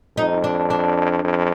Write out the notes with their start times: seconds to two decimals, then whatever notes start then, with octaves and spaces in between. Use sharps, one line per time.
0.17 F2 D#4
0.44 D4
0.70 D4
1.24 F2